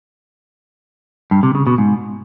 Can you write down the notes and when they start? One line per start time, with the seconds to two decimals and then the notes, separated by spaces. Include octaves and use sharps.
1.31 G2
1.43 C3
1.55 C#3
1.67 B2
1.78 G#2